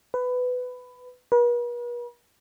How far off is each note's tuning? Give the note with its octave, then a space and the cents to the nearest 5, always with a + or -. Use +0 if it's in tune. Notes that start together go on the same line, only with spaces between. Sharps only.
B4 +15
B4 -45